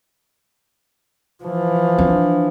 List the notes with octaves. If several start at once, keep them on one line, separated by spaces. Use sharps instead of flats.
E3 F3
D4